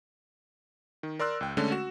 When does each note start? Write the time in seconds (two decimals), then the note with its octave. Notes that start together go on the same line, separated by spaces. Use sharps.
1.03 D#3
1.19 A#4 D5 C6 E6 F#6
1.41 C#2 G5
1.57 D3 G#3 A3 C#4 D4 A4
1.72 F#4 E7